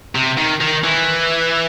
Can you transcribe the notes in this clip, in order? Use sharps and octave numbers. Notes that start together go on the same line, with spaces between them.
C3
D#3
D#3
E3